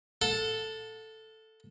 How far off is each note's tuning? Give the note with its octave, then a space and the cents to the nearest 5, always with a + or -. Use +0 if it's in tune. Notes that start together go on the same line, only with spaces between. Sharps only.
A4 +0 F#5 -40